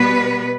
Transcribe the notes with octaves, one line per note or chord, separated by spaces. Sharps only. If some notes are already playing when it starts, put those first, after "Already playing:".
Already playing: B2 G3 B3 B4